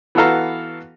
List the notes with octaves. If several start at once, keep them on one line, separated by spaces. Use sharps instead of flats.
E3 B3 F#4 A4 F5 A#5